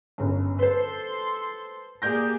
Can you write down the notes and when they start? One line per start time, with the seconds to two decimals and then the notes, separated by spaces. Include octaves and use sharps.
0.18 G1 F#2
0.59 A4 B4 C5 C6
2.02 A#3 G4 G#4 D5 G6 A#6